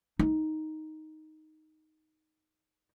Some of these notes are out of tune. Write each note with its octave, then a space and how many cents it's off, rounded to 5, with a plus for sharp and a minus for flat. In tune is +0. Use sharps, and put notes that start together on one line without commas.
D#4 +5